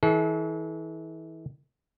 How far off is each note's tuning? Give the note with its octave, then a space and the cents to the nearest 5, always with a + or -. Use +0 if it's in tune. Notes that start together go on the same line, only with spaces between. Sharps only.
E3 -35 A4 -45